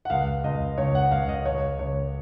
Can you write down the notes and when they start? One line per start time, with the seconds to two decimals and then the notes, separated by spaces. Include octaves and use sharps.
0.05 F#5
0.10 C#2 F5
0.44 C#2 D#5
0.78 C#2 C#5
0.95 F#5
1.11 C#2 F5
1.29 D#5
1.45 C#2 C#5
1.79 C#2 C#5